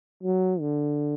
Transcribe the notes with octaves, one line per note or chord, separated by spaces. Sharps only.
F#3
D3